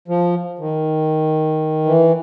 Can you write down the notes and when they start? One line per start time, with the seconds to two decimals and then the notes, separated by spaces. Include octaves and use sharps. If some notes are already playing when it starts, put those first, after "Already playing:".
0.08 F3
0.59 D#3
1.85 E3